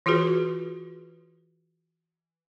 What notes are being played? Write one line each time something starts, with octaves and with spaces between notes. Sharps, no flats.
E3 F4 F#4 G#4 B4